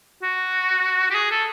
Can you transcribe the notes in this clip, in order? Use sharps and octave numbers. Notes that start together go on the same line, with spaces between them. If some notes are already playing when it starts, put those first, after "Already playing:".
F#4
G4
G#4
A4